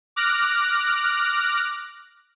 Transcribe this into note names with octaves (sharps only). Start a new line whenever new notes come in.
D6 F6 F#6 A#6